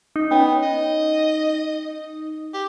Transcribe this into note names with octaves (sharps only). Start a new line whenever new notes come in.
D#4
B3 C#4 C#5
D#5
G4